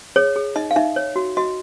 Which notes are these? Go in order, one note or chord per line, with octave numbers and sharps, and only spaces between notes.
G#4 C#5
G#4
D#4 D#5
F5
D#4 E5
C#5
F#4
F#4 D#5